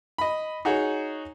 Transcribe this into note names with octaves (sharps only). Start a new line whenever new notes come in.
D#5 B5
D#4 F#4 G#4 C#5